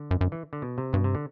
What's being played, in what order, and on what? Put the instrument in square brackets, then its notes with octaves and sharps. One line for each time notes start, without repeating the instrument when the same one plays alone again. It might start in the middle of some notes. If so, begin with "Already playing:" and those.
Already playing: [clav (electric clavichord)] D3
[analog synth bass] F#2
F#2
[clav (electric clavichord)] E3
D3
B2
C3
[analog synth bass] G2 [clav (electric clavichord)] B2
[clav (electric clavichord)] C3
D3